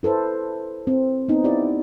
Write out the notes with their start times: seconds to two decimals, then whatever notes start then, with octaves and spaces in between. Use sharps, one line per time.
0.03 E4 A4 B4 C5
0.87 C4
1.28 B3 C4 D#4
1.44 E4 G4 D5